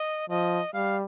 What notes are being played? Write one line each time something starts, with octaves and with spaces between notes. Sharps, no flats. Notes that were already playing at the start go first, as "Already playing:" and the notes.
Already playing: D#5
F3 D#5
G3 F5